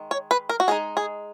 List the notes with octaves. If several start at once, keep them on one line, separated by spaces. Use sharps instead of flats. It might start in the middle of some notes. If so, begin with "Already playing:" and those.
Already playing: D#3 G#3
C#5
B4
A#4
F#4
G#3 D#4 G#4
G#4